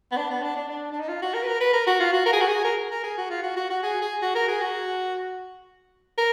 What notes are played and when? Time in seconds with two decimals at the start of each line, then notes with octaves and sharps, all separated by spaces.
0.12 B3
0.17 D4
0.30 B3
0.42 D4
0.56 D4
0.69 D4
0.92 D4
1.00 D#4
1.08 F4
1.22 F#4
1.34 A#4
1.42 B4
1.47 A#4
1.60 B4
1.73 A#4
1.87 F#4
2.00 F4
2.13 F#4
2.26 A#4
2.33 G#4
2.41 F#4
2.48 G#4
2.64 A#4
2.91 A#4
3.04 G#4
3.17 F#4
3.30 F4
3.43 F#4
3.56 F#4
3.70 F#4
3.83 G#4
4.02 G#4
4.22 F#4
4.35 A#4
4.48 G#4
4.61 F#4
6.18 A#4